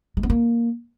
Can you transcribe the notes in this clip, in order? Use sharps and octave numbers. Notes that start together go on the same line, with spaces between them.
G#3
B3
A#3